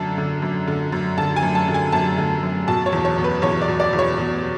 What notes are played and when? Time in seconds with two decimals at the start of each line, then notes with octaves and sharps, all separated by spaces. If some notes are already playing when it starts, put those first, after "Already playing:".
Already playing: F#2 D3 A5
0.18 D3
0.42 F#2
0.68 D3
0.92 F#2
1.18 D3 A5
1.36 G#5
1.43 F#2
1.55 A5
1.68 D3
1.74 G#5
1.92 F#2 A5
2.18 D3
2.43 F#2
2.67 B2 A5
2.86 C#5
2.93 E2
3.05 C#5
3.18 B2
3.24 B4
3.42 E2 C#5
3.62 D5
3.68 B2
3.80 D5
3.93 E2
3.99 C#5
4.18 B2